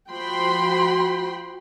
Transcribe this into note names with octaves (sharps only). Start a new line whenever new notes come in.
F3 F#4 G5 B5 C6